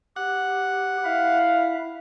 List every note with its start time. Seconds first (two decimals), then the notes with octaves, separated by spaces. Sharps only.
0.16 G4 F#5
1.04 E4 E5 F5